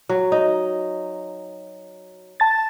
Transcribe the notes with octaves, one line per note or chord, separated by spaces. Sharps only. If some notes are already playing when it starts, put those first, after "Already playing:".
F#3
D#4
A5 A6